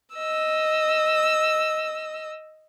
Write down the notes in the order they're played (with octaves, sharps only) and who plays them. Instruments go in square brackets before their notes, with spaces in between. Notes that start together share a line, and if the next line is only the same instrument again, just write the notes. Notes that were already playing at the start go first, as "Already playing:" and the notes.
[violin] D#5 E6